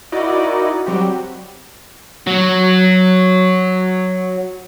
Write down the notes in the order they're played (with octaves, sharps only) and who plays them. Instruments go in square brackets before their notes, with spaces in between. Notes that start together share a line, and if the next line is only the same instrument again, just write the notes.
[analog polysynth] D#4 E4 F#4 A#4 D5 D#5
F#3 G3 C4 F#4 G4
[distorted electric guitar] F#3 F#4